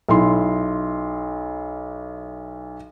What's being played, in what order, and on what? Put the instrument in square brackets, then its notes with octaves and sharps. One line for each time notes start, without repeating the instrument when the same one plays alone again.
[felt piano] B1 E4 C6